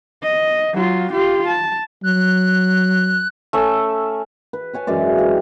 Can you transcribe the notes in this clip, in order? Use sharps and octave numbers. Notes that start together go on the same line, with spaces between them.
D#5
F#3 F4
F4 G4
A5
F#3 F#6
A3 C#4 E5
B4
B4 C#5 G#5 A5
F#2 E3 G#3 D5
G4 F5